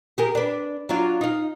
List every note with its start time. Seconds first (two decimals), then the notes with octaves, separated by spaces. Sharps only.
0.18 G4 G#4 A#4
0.35 D4 B4
0.89 F#3 D4 F4
1.21 D#4 F5